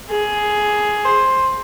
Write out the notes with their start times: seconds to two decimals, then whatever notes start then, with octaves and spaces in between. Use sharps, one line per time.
0.10 G#4
1.05 C5